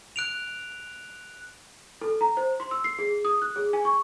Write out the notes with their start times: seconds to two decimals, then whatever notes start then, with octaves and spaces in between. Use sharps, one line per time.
0.16 F#6 D7 F7
2.01 A4
2.21 A#5
2.37 C5
2.60 C6
2.71 E6
2.84 C7
2.99 G#4
3.25 D#6
3.42 F#6
3.56 G#4
3.73 G#5
3.85 C#6